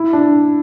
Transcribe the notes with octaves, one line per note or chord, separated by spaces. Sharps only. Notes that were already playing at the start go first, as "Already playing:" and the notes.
Already playing: E4
D4